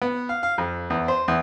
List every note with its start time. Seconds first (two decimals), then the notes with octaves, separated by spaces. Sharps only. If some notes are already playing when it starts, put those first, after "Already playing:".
0.02 B3
0.29 F5
0.43 F5
0.58 F2
0.90 E2
1.08 C5
1.28 E2